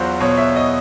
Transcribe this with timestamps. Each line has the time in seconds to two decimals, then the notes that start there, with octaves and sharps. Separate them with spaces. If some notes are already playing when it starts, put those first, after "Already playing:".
Already playing: E2 F#3 F4 F#4 C5
0.20 B2 C#5
0.37 E5
0.56 D#5